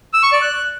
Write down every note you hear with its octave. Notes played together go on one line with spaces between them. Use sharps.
E6
C#6
D5
F#6